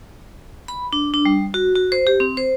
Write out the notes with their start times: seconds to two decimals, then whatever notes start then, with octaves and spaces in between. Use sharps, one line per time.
0.68 B5
0.93 D4
1.14 D4
1.25 G3
1.54 F#4
1.75 F#4
1.92 C5
2.07 G4
2.20 C4
2.37 C5